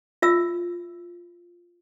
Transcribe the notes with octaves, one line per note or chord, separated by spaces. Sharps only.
F4 E5 E6